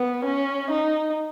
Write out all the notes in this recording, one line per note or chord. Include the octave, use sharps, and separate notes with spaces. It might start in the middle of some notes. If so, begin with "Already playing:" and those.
Already playing: B3
C#4
D#4